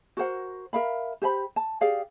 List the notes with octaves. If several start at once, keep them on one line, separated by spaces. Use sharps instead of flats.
F#4 A#4 C5 F#5
A#4 E5 F5 B5
G4 C5 A5 B5
A5
G4 G#4 D5 F5